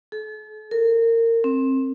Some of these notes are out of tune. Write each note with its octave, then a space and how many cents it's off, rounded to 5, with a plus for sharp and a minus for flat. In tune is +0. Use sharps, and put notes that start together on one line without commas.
A4 -40
A#4 -25
C4 +20